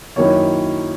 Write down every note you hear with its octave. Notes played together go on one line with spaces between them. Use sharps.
F#2 D#3 A#3 C#4 E4 C#5